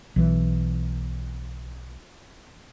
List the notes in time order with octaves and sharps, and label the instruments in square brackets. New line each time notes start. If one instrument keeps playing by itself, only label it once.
[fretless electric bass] B1 E3